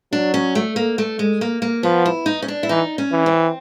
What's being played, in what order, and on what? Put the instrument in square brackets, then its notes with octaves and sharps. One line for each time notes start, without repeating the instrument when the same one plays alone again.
[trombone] F#3 [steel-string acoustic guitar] D4
[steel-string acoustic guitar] C#4
A3
A#3
A3
G#3
A#3
A#3
[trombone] F3 [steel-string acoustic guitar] B3
[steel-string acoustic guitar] E4
D#4
C#4
D4
E4
[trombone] E3 [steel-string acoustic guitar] D#4
[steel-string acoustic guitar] C#4
[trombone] E3
[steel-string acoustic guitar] C4